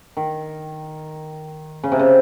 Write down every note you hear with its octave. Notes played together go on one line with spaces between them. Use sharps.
D#3
C#3
C3
C#3